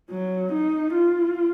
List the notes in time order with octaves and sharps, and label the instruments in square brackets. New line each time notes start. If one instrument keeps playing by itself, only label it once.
[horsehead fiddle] F#3
D#4
F4